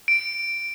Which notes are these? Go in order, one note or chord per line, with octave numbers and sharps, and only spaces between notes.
D7